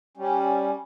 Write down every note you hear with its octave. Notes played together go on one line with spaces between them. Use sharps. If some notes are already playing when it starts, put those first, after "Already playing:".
G3 C#4